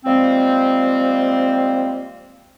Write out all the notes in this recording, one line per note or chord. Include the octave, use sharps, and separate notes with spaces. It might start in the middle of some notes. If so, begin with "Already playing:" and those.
F3 G3 G#3 A#3 C4